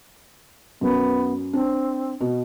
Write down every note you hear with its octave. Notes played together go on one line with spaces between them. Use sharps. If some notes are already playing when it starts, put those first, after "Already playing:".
F#2 B3
C4 D4
B2